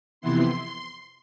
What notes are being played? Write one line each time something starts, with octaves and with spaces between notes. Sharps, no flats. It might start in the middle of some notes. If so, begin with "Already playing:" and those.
F2 C3 E3 B3 E4 C6